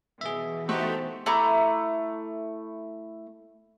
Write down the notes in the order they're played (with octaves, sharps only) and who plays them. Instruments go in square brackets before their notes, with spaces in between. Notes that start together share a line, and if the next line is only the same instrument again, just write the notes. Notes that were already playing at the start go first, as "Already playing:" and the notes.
[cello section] B2 E3 [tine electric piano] G#4 E5
[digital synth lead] A3 [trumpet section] D#4 F#4 G4 [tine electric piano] C5
[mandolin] A3 E4 A#5 D6